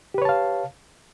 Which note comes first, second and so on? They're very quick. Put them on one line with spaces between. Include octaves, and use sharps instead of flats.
G4 B4 C#5 A5 F5